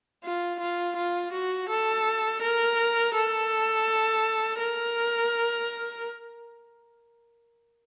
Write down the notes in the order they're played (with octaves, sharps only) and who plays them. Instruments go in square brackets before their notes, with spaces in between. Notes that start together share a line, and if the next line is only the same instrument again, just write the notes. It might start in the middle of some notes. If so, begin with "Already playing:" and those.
[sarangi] F4
F4
F4
F#4
A4
A#4
A4
A#4